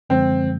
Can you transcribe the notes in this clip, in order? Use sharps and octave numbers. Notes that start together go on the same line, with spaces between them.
F#2 D3 F3 G#3 C4